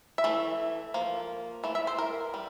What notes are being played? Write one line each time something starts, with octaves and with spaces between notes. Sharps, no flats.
E5
E3 A3
F3 A#3
E3 A3
E5
C5
A#4
G3